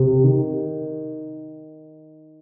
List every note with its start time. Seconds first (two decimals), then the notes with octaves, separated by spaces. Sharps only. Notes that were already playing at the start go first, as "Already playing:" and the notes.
Already playing: C3
0.24 D#3